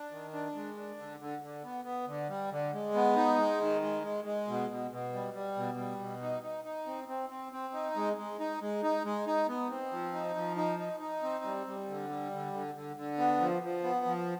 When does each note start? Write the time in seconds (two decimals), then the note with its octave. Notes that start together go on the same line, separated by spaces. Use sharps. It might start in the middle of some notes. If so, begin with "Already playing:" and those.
Already playing: D4
0.11 D#3
0.33 D4
0.55 G#3
0.77 D4
0.98 D3
1.20 D3
1.42 D3
1.63 B3
1.85 B3
2.07 D3
2.29 G3
2.51 D3
2.73 G#3
2.95 B3
3.16 D#4
3.38 G#3
3.60 D#3
3.81 G#3
4.03 G#3
4.24 G#3
4.47 B2
4.69 B2
4.91 B2
5.13 G3
5.34 G3
5.56 B2
5.77 G3
5.99 B2
6.22 D#4
6.43 D#4
6.64 D#4
6.86 C4
7.08 C4
7.30 C4
7.52 C4
7.73 D#4
7.96 G#3
8.17 G#3
8.39 D#4
8.61 G#3
8.83 D#4
9.05 G#3
9.27 D#4
9.48 B3
9.70 C4
9.91 F3
10.13 D#4
10.36 F3
10.57 D#4
10.79 D#4
11.00 D#4
11.22 C4
11.44 G3
11.67 G3
11.88 D3
12.09 G3
12.32 D3
12.53 D3
12.75 D3
12.96 D3
13.18 B3
13.40 F3
13.62 F3
13.83 B3
14.05 F3